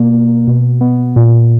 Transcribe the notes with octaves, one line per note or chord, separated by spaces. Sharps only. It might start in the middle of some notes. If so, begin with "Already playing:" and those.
Already playing: B2 A#3
B2
B3
A#2